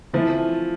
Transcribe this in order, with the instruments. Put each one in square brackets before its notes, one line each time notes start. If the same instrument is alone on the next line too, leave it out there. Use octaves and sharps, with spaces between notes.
[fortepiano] E3 A3 C4 E4 [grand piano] F3 F4